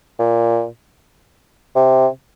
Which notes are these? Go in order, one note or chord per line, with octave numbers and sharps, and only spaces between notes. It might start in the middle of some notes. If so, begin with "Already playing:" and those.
A#2
C3